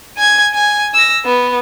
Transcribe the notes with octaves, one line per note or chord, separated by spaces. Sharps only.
G#5 G#6
G#5
E6 A#6
B3